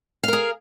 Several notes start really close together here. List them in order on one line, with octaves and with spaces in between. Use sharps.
F5 A#4 G#4